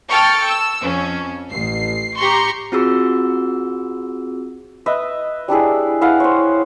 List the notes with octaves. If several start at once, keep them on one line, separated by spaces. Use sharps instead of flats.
A4 G5 C#6 F6 A6
E6
F2 C#4
A1 C7
G4 A#5 C6 C#6
C4 F4 F#4 G#4 E6
B4 D#5 E5
G3 D4 E4 G#4
E4 B4 F5 F#5
C5 C#5